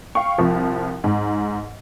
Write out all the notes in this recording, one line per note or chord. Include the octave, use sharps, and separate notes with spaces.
F5 G5 C#6
C2 F3
G#2